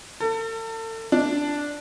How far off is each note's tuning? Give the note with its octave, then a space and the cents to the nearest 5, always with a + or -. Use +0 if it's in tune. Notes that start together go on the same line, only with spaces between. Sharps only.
A4 +35
D4 -5